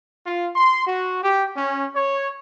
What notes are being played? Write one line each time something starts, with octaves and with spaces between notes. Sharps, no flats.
F4
C6
F#4
G4
C#4
C#5